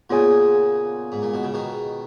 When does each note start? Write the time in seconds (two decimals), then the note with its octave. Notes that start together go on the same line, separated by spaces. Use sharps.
0.10 A#2 C#3 B3 F4 G#4 C#5 G#5
1.12 G#2
1.22 A#2
1.34 B2
1.43 C#3
1.54 B2 D#3